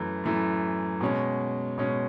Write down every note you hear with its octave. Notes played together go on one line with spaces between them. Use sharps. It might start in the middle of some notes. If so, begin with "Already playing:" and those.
Already playing: F#2 E3 A3
F#2 E3 A3
B2 G#3 C#4
B2 G#3 C#4